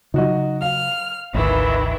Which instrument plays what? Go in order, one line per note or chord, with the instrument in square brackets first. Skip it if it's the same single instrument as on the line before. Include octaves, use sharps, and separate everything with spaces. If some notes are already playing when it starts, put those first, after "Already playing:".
[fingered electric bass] C#3 F#3 [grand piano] D#4 F#4 D#5
[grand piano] F5 [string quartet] F6
[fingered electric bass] G#1 D2 [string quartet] D#3 E3 E4